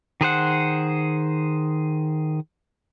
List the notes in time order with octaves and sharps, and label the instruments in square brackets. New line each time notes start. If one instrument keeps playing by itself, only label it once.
[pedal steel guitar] D#3 G#4 C5 F#5